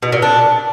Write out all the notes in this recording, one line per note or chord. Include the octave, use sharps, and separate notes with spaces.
B2
A#2
D4